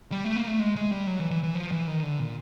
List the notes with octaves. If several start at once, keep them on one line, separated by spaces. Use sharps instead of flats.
G3
A3
A#3
A3
G#3
G#3
G3
F#3
E3
E3
E3
F3
E3
D#3
D3
A#2